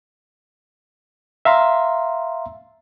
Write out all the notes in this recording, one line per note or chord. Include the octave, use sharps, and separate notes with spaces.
E5 F5 A#5 C6